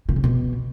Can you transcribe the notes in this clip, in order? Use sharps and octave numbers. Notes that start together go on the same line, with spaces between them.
B2
C#3
B2